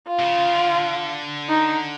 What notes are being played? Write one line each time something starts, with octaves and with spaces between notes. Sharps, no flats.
F4
C3
C#3
D3
D#4